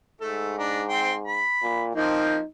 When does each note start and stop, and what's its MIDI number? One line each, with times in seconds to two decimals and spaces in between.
0.21 1.44 44
0.21 0.53 57
0.21 0.53 69
0.59 0.83 62
0.59 0.83 82
0.89 1.14 60
0.89 1.14 79
0.89 1.14 84
1.27 1.83 83
1.63 1.93 46
1.95 2.38 53
1.95 2.38 58
1.95 2.38 60
1.95 2.45 63